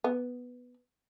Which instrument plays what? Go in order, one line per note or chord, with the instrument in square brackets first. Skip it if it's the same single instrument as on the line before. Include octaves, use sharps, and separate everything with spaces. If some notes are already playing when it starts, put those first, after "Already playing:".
[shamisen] B3